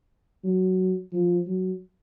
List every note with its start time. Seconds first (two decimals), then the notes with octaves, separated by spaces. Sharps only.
0.44 F#3
1.13 F3
1.47 F#3